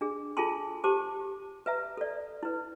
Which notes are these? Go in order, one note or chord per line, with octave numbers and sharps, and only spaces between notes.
D4 G#4
F4 G#4 A4 G#5 A5 C6
G4 C5 A5 D6
B4 E5 A#5
A4 D5
E4 B4